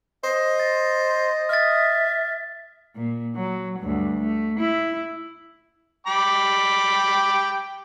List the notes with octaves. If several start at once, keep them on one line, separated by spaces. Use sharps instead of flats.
C5 D#5
A6
E5 F6 A6
A#2
F#3
D2 G2
A3
E4
G5 B5 D6